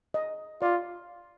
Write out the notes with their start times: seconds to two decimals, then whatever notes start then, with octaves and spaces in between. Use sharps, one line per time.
0.14 D#5
0.62 F4 D5